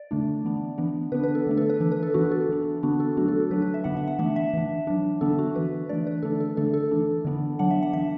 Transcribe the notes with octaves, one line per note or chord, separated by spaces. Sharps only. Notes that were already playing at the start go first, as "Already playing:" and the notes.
Already playing: D5
D3 A3 D4
E3 B3 D4
E3 B3 D4
D3 B3 D4 B4
B4
A4
D3 A3 D4
A4
B4
E3 D4
B4
A4
E3 B3 D4 F#4
A4
E3 D4
D3 B3 D4 F#4
A4
F#3 A3 D4 F#4
A4
A4
F#3 D4 B4
B4
E5
D3 B3 D4 F#5
E5
F#5
E3 A3 D4 E5
E5
E3 D4
F#3 D4
D3 B3 D4 A4
F#4
E3 D4 B4
E3 A3 D4 D5
B4
D3 A3 D4 A4
A4
D3 A3 D4 A4
A4
E3 D4
D3 B3 D4
F#3 D4 F#5
E5
F#5
E3 D4 E5